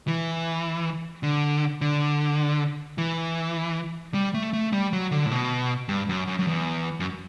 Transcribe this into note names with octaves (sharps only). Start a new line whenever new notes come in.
E3
D3
D3
E3
G3
A3
A3
G3
F#3
D3
A2
B2
G2
F#2
F#2
F#2
E2
F#2